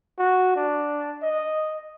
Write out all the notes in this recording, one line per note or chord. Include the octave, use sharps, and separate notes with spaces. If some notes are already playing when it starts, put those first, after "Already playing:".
F#4
D4
D#5